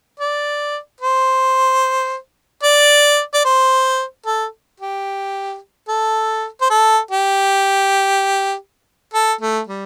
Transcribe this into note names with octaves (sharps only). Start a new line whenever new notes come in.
D5
C5
D5
D5
C5
A4
G4
A4
C5
A4
G4
A4
A3
G3